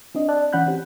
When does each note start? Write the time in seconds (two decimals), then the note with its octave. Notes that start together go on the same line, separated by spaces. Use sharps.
0.15 C4 D4 D#5
0.29 D5 A5 F#6
0.53 E3 C#4 F#5 B5 F#6 G6
0.66 C4 C#4 G4